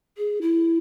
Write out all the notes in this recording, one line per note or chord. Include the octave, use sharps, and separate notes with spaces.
G#4
E4